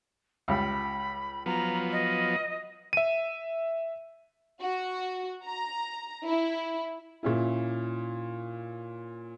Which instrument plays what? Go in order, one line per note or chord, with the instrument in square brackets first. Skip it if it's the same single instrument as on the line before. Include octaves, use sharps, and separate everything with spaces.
[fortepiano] C#2 G3 [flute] B5
[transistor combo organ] F3 F#3 B3 [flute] A#5
[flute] D#5
[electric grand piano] E5 D#7
[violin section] F#4
A#5
E4
[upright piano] A#2 C#4 E4